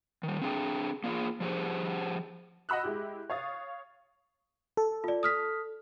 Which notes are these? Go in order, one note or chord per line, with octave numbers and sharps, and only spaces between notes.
D#3 G3
C4 D4 G#4 F5 G5
A#3 F4 F#4 G#4
F3 G4 G#4 C5
D#5 F#5 B5 E6 F#6
G#3 E4 G4
C#5 F5 D#6 A6
A4
F4 D5
D#6 F6 B6